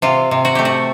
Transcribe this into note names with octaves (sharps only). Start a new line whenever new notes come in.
C3 F4
C3
F#4
A3 G4
F#4